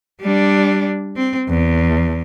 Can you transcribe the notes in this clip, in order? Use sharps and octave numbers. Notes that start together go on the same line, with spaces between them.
G3 D4
C4
E2